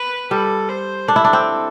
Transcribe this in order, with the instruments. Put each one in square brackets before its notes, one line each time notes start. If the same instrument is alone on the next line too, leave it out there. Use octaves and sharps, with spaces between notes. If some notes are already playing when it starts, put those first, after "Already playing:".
Already playing: [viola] B4
[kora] G3 [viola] A4
[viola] C5
[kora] D4 [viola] A4
[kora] E4
D4
C4